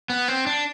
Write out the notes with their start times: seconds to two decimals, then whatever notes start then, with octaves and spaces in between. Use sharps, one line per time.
0.10 B3
0.28 C4
0.47 D4